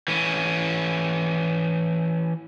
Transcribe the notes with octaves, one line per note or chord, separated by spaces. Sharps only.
E3 C#4